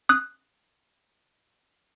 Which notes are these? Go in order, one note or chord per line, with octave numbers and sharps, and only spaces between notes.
D#6 F#6